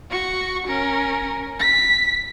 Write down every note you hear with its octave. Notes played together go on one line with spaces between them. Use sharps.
F#4 C#6
C#4 A#4
B6